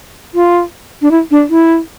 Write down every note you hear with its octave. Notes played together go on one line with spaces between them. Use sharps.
F4
D4
E4
D4
E4